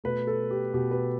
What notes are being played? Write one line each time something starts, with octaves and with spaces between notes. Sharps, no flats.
B2 A3 B4
A4
G4
B2 A3 G4
B4